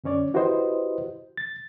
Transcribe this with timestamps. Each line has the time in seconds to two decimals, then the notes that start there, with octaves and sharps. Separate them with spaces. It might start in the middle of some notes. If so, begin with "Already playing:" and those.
0.04 F#2 D3 C#4 C#5 D5
0.34 E4 F#4 G4 B4 C5 D#5
1.37 A6